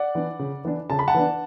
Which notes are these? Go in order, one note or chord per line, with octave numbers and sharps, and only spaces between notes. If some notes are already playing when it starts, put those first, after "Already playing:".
Already playing: D5 F#5
E3 B3 D4
C#3
E3 B3 D4
C#3 A5
B5
F#5 A5
E3 B3 D4